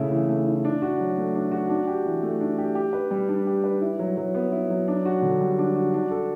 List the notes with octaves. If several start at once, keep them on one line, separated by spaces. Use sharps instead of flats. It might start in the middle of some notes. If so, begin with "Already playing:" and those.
Already playing: C#3 A3 E4
E3
A3
E4
D4
F#4
F#3
A3
D4
F#4
D4
G4
E3
A3
D4
G4
G4
B4
G3
D4
G4
B4
E4
F#3
F#3
B3
E4
F#3
D4
F#4
D3
G3
D4
F#4
D4
A4